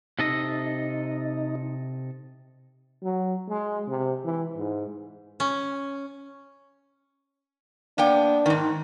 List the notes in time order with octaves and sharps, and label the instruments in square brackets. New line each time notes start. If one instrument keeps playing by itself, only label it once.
[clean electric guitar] C3 A4 D#5 [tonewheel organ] D#4
[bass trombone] F#3
G#3
C3
E3
G#2
[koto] C#4
[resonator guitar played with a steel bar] A#3 B3 G5 [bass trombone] D4
[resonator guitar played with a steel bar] G#2 D#3